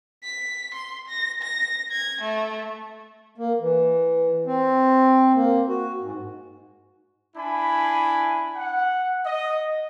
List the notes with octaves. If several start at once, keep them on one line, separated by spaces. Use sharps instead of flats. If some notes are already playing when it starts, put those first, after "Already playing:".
B6
C6
A#6
A#6
G#6
A3
A#3
E3
C4
A#3
F#4
G#2
D4 E4 G#5 B5
F#5
D#5